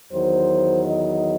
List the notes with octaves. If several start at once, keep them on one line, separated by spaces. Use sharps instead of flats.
E2 D#3 F#3 C5
D#5